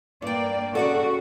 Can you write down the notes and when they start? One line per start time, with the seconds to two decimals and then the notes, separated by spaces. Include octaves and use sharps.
0.22 G2 A#3 D5 G5
0.75 C#3 F#4 A4 D5 F#5